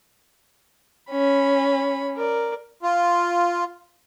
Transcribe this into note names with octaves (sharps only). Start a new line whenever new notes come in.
C#4 B5
A#4 D5
F4